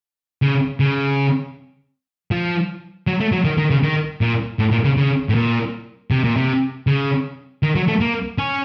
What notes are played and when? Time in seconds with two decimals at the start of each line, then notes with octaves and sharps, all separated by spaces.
0.42 C#3
0.80 C#3
2.31 F3
3.07 F#3
3.20 A3
3.32 F#3
3.45 D#3
3.58 D#3
3.71 C#3
3.83 D#3
4.21 A#2
4.59 A2
4.71 A#2
4.84 C#3
4.97 C#3
5.29 A2
5.35 A#2
6.11 C3
6.24 A#2
6.37 C3
6.87 C#3
7.63 D#3
7.75 F#3
7.88 A3
8.01 A#3
8.38 C#4